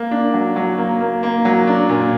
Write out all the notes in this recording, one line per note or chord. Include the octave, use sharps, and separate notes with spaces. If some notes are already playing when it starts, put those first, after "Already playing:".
Already playing: A#3
D4
F#3
F#3
A#3
A#3
A#3
F#3
D4
A#2